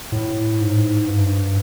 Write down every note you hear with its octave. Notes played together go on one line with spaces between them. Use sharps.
A2
G#2
G2